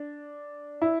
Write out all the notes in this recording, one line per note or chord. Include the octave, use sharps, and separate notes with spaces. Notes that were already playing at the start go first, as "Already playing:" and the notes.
Already playing: D4
E4